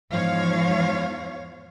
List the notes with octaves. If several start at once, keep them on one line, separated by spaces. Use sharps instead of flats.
E2 G#2 F3 C#5 F5